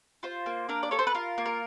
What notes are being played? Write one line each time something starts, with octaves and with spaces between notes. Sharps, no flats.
F4 C5
A#3
D4 A#4
D5
A4 C#5
C5
B4
F4 A#4
A#3
A#4